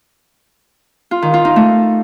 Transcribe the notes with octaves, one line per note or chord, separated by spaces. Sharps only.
F4
D#3
F4
D#4
A3